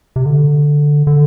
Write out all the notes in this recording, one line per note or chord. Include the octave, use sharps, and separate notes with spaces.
C3
D3
D3